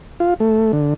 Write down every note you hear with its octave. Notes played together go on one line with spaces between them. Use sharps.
F4
A3
D3